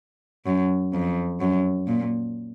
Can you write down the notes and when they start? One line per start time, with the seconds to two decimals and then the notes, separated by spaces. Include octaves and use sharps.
0.46 F#2
0.94 F2
1.41 F#2
1.88 A#2